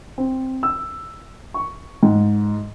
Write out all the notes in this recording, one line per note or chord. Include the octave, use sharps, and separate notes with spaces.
C4
E6
C#6
G#2